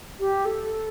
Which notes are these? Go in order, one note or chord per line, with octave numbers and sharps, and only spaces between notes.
G4
A4